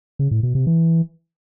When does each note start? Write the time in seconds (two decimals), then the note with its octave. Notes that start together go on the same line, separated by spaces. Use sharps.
0.19 C#3
0.31 A2
0.43 B2
0.55 C3
0.67 E3